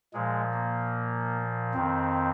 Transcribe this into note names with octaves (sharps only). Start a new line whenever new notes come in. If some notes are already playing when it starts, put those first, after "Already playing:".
A#2 F3 G#3
A#3
F2 D#3 C4